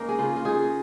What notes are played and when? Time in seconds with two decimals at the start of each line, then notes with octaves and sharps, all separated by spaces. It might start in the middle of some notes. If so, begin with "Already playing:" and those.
Already playing: A#3 C#4 D#4 A#4
0.09 G#4
0.19 C#3 F4
0.36 F4
0.45 D#4 G#4